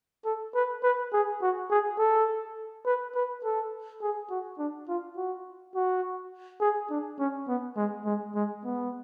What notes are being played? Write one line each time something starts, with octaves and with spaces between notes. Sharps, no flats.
A4
B4
B4
G#4
F#4
G#4
A4
B4
B4
A4
G#4
F#4
D4
F4
F#4
F#4
G#4
D4
C#4
B3
G#3
G#3
G#3
B3